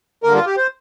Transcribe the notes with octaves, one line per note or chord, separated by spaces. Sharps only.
G2 D3 A#3 A#4
F4
G4
C5